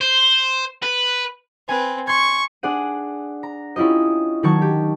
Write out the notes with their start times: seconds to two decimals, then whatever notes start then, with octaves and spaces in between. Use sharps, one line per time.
0.01 C5
0.83 B4
1.69 C4 B4 G#5
2.07 C6 C#6 G#6
2.63 D4 G#4 D5 F#5 D#7
3.43 A#5
3.76 C#4 E4 F4 G4 D#5
4.43 D#3 F#3 A5 C#6 G#6
4.62 G4